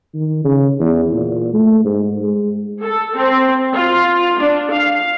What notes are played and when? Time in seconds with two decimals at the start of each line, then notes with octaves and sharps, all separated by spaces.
0.14 D#3
0.45 C#3
0.80 E2
1.13 A#2
1.53 A3
1.84 G#2
2.20 G#3
2.82 A4
3.18 C4
3.73 F4
4.39 D4
4.73 F5